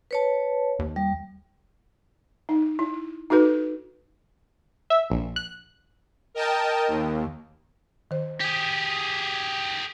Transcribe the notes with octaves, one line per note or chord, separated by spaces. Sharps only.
B4 C#5 A5
D#2
G3
D#4
E4
D#4 F#4 A4 B4
E5
A#1
F#6
A#4 D#5 G5 A5
D#2
D#3 C5
G4 G#4